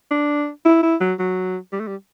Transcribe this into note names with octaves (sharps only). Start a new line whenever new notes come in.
D4
E4
E4
F#3
F#3
G3
A3
G3